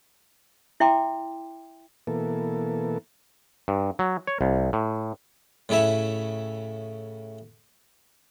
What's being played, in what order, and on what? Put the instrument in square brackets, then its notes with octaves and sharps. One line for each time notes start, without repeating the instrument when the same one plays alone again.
[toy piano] E4 E5 G5 C6 D6
[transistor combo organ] B2 E3 A#3 A4
[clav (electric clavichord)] G2
F#3
C#5
C2
A2
[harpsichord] A2 C#3 E4 C#5 E5